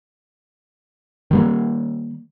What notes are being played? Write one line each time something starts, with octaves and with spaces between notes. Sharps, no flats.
D#3 G3 A#3